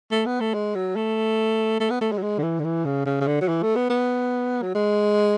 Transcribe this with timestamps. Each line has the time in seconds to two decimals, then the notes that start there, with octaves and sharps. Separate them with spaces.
0.11 A3
0.26 B3
0.40 A3
0.54 G#3
0.75 F#3
0.96 A3
1.80 A3
1.90 B3
2.01 A3
2.12 G#3
2.18 F#3
2.22 G#3
2.39 D3
2.43 E3
2.59 D3
2.64 E3
2.85 C#3
3.06 C#3
3.21 C#3
3.27 D3
3.41 F#3
3.48 E3
3.62 A3
3.76 B3
3.90 B3
4.62 F#3
4.75 G#3